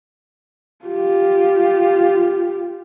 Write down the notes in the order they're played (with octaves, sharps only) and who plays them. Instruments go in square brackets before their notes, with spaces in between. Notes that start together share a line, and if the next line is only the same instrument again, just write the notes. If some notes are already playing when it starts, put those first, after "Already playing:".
[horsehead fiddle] F4 G4